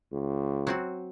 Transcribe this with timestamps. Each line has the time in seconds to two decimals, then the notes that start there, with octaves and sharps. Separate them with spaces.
0.12 C#2
0.67 F#3 C4 F#4